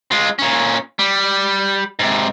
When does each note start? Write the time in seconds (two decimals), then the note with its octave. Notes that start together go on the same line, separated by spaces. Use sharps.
0.12 G#3 F4
0.39 A#2 C#4
0.99 G3
1.99 G#2 C3